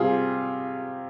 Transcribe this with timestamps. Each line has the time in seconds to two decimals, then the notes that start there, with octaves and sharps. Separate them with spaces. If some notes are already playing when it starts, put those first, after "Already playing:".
Already playing: C3 G3 F4 G#4